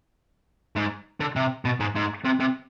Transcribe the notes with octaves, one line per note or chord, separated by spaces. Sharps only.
G#2
D3
C3
B2
G#2
G#2
C3
C3